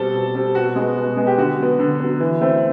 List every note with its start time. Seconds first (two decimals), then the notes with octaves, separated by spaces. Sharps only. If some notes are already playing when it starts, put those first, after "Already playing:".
Already playing: B2 G3 C4 A4
0.14 B2
0.35 G3 C4
0.55 B2 F#4
0.76 G#3 B3
0.97 B2
1.17 G#3 B3
1.27 G4
1.38 D3 F#4
1.59 F#3 B3
1.79 D3
2.00 F#3 B3
2.20 E3
2.41 A3 C4